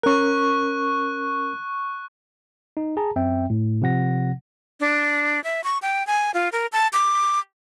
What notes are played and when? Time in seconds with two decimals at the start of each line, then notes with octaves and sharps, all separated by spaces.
0.03 C#4 A#4 C#6 F#6
2.77 D#4
2.97 G#4 A5 A#5
3.16 F#2 C4 E5 G5
3.50 A2
3.82 C3 F3 F#5 A#6
4.80 D4
5.44 E5
5.64 C#6
5.82 G5
6.07 G#5
6.34 F4
6.52 A#4
6.73 A5
6.93 D6